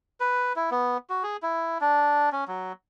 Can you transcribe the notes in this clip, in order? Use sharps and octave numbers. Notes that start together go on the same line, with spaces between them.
B4
E4
B3
F#4
G#4
E4
D4
C#4
F#3